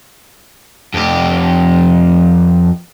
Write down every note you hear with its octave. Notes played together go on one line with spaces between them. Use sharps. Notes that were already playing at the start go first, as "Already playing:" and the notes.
F2 G4